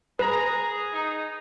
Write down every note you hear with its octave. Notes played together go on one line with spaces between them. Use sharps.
G#4 B4 A#5
D#4